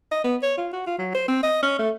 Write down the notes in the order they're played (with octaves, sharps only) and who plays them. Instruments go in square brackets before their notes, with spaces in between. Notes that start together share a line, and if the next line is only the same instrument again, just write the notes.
[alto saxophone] D#5
B3
C#5
F4
F#4
F4
F#3
C5
C4
D#5
C#4
A3